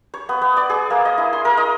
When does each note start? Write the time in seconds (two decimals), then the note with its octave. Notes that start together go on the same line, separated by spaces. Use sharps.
0.14 C#5
0.29 B3
0.41 B3
0.57 D5
0.70 G#4
0.90 A#3
1.05 D#5
1.18 E4
1.33 C6
1.45 A#4
1.57 D#5